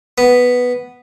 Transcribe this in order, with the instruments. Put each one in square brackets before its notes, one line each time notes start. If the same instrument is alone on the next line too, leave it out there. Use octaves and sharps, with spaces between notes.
[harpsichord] B3